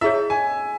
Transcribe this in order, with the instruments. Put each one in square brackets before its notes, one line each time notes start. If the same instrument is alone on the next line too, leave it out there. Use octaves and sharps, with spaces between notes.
[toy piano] E4 G#4 C#5 [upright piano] E5
[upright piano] G#5